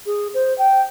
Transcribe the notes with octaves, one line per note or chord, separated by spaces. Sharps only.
G#4
C5
G5